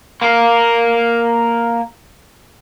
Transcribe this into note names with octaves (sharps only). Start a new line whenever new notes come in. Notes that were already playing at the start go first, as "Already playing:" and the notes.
A#3 A#4